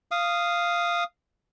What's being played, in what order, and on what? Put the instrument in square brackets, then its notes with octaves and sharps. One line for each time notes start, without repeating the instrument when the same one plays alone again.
[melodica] F5 D#6